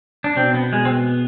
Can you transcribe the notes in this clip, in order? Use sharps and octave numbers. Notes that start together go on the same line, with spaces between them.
D4
B2 C4
B3
G#3
C4
B3